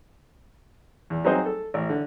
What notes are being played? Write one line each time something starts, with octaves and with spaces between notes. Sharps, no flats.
E2
F#3 C4 D#4 G#4 C5 D#5
A4
A1
D3